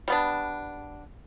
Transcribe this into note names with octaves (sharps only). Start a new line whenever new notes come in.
G3 B3 D4